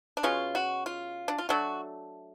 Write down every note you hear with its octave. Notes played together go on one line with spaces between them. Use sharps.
D4
B2 G#3 C#4 F4
F#4
F4
D4
F4
F#3 A3 D4 F#4